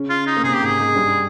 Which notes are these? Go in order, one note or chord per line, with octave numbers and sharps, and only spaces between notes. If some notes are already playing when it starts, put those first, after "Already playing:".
Already playing: C#3 C#4
F4
D#4
A#3
C3 C4 G#4
G4
G#2 G#3
G#4
G#2 G#3
G2 G3